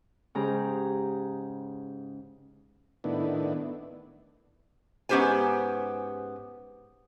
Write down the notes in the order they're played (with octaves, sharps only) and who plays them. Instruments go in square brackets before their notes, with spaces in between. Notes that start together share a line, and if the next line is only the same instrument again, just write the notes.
[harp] G#2 C#3 G4 G#4 A#5
[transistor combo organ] A2 D#3 B3 D4 E4
[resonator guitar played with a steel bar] G#2 B3 C#4 G4 C5 G#5